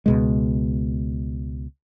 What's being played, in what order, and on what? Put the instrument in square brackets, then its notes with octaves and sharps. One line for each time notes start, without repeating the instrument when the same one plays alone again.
[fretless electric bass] C#2 B2 G#3